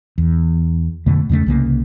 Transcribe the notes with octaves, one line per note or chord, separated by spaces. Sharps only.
E2
F2 B2 D3 A3
E2 C#3 G#3 A3
C2 C#3 A#3